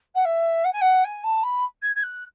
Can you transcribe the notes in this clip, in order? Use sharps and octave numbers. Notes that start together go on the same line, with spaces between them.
F#5
E5
F#5
G#5
F#5
G#5
A5
B5
G#6
G#6
F#6